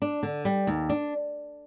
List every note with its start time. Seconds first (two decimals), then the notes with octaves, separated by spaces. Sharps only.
0.02 D4
0.23 D3
0.45 G3
0.67 D#2
0.89 D4